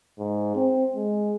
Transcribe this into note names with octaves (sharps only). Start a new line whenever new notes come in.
G#2
C4
G#3